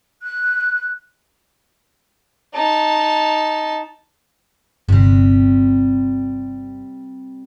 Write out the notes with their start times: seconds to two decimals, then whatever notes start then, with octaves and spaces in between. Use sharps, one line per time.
0.23 F#6
2.54 D#4 A5
4.89 G1 C3 G3